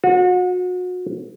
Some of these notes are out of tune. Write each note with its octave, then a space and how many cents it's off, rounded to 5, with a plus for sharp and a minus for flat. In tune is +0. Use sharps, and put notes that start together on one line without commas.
F#4 -35